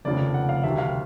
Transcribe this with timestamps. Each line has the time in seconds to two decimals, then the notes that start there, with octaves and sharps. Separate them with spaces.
0.05 F1 D#2 C#3 F3 A3 D5
0.34 F#5
0.49 F5
0.63 D2 C3 D#3 G3 E5
0.78 F5